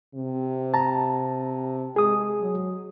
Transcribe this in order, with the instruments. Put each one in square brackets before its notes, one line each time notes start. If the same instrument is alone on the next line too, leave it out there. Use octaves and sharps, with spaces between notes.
[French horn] C3
[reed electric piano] A5 A#5
[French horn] G#3 [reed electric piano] G#4 D#6
[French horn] F#3